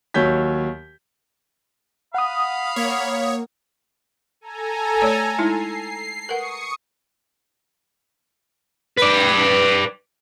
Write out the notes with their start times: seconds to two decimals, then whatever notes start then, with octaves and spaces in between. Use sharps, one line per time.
0.14 D#2 F#3 C#5 G6 B6
2.14 F5 F#5 B5 D#6
2.76 A#3 C#5
4.41 A4 G#5 A#5
5.01 A3 C#5 D5
5.39 G#3 D#4 E4 C7
6.29 A#4 B4 F#5 C#6 D#6 C#7
8.97 B4 D5